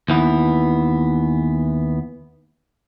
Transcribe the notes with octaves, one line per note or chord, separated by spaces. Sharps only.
D#2 E3 B3